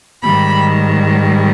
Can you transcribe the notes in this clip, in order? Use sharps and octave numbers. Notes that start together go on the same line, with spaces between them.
G#2 D#3 G3 B5